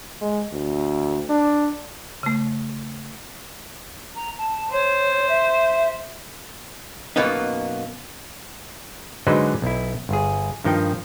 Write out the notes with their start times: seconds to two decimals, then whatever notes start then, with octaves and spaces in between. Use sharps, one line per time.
0.21 G#3
0.52 D2
1.30 D4
2.23 C#3 A3
4.15 A#5
4.38 A5
4.72 C5 C#5
5.28 E5
7.16 F#2 B2 A#3 B3 D#4
9.27 D3 F#3 G#3 D#4 B4 C5
9.62 B1 E4
10.09 G1 G#4
10.64 G2 D#3 F3 D#4 G5